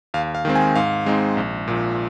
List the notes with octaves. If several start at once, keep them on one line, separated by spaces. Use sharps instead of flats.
D#2 F5
F5
D#3 G#3 C4
G#5
G#2 F5
G#3 C4 D#4
A#1
A#2 F3